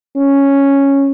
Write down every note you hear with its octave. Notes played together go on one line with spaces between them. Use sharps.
C#4